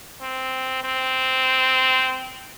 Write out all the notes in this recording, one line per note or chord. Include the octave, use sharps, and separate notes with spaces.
C4
C4